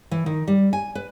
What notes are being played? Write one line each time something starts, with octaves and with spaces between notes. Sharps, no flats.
E3
D#3
G3
G#5
B4